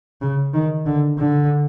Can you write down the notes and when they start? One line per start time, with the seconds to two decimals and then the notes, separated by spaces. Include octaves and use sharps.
0.21 C#3
0.54 D#3
0.86 D3
1.18 D3